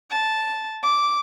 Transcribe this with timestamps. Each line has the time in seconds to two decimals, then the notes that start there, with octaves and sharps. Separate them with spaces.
0.11 A5
0.83 D6